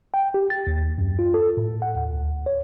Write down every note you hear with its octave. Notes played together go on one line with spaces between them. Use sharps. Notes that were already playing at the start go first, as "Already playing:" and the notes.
G5
G4
A6
D#2
F#2
F4
A4
A2
F#5
D#2
D2
C#5